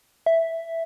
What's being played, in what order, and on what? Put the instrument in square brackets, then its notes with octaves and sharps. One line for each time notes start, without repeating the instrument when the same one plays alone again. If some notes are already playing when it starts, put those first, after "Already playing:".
[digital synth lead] E5